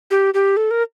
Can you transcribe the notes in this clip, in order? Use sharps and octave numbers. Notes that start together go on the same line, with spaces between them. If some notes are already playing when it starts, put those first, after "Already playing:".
G4
G4
A4
A#4